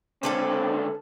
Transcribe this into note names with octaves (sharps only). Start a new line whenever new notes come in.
C#2 D3 C4 C#4 A4 B4